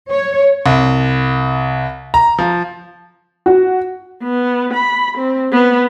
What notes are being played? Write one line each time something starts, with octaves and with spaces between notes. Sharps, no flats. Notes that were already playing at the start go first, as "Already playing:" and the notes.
C#5
C2
A#5
F3
F#4
B3
B5
C4
B3